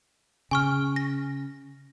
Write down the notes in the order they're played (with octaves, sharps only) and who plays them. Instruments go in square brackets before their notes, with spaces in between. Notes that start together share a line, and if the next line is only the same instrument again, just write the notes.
[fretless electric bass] C#3 [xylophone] G#5 C#6 F6
[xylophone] A#6